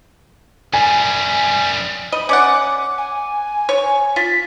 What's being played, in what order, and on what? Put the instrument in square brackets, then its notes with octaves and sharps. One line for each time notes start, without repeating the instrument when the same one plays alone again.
[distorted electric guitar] F#2 G3 [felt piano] G#5
[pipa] D#5 [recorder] B5
[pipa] C#4 D5 F#5 [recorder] D6
[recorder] G#5
[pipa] C#5
[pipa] F4 [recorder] B6